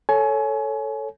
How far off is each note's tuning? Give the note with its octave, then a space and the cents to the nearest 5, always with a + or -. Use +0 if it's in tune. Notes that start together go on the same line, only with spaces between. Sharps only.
A4 +0 C#5 +0 G#5 +30